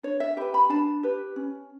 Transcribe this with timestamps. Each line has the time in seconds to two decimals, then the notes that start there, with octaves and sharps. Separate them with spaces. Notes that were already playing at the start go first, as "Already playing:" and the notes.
0.03 D4 C#5
0.20 E5
0.37 G4 B4 G5
0.54 B5
0.69 D4 A5
1.03 G4 B4
1.36 C#4